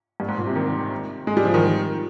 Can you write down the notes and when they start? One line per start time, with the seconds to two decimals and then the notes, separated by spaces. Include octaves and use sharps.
0.20 G2
0.29 G#2
0.38 A#2
0.47 C3
0.56 D#3
1.27 G#3
1.37 G3
1.45 F3
1.54 D#3